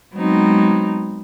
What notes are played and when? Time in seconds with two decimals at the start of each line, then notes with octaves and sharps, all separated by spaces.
0.14 F#3 G#3 B3 C4 D#4